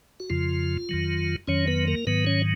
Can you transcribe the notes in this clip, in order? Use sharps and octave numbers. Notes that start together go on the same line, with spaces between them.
F#4
F2 C#3 F3 F4
F2 D#3 F#3
F2 D#3 F#3 C#4 C#5
B3 B4
A#3 A#4
G#2 D#3 F#3 B3 B4
C#4 C#5